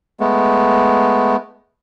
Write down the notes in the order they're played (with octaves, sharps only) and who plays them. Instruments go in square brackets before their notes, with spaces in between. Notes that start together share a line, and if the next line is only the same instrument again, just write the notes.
[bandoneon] G#3 A3 B3